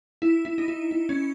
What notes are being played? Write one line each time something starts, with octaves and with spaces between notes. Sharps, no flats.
E4
E4
D#4
E4
E4
C#4